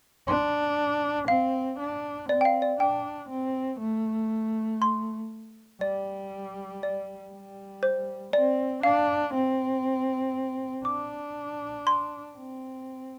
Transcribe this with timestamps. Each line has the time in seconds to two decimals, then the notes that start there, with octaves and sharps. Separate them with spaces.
0.27 D4 C6
1.28 C4 F5
1.79 D4
2.29 C4 D5
2.41 G5
2.45 F5
2.62 D5
2.80 D4 G5
3.29 C4
3.80 A3
4.82 C6
5.81 G3 D5
6.83 D5
7.32 G3
7.83 C5
8.33 C4 D5
8.83 D4 F5
9.34 C4
10.85 D4 D6
11.87 C6
12.37 C4